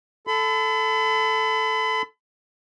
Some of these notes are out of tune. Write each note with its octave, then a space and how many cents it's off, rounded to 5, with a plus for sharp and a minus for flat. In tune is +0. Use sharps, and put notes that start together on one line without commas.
A4 -5 B5 +40